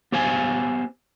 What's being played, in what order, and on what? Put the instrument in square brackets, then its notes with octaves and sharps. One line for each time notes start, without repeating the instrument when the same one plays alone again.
[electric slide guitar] B3 G4 C5 F5 G#5